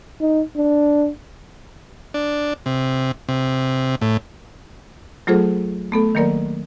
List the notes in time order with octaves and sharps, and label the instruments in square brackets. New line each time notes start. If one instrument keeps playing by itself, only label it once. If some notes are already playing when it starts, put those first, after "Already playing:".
[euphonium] D#4
D4
[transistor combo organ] D4
C3
C3
A2
[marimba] F#3 A3 F4 G#4 A4 C5
A3 B3 A4
D#3 F#3 A#3 A#4 D5